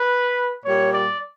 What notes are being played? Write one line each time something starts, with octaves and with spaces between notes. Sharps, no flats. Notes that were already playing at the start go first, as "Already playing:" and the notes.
Already playing: B4
A#2 G3 C#5
D5